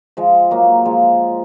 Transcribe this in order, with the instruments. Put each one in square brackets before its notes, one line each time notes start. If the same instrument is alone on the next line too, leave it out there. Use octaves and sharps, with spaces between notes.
[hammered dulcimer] F3 G#3
F#3 A#3
F3 G#3